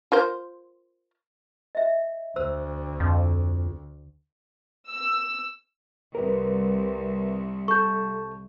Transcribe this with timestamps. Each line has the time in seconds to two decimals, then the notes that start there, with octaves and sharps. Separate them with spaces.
0.12 F4 A#4 C5
1.75 D#5 E5
2.36 D2 C5 E6
3.00 F2
4.89 E6
6.15 C2 A#4 B4
7.68 A4 A5 C#6 G6